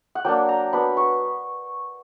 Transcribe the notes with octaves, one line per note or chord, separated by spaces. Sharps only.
F#5
F#3 A#3 D4 G5
A#5
F#3 B3 D4 B5
C#6